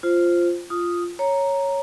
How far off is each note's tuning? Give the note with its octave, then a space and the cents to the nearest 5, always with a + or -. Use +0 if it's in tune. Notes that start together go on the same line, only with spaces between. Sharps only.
F4 -5 C5 +0
F4 -5 D#6 +0
C#5 +0 A#5 +0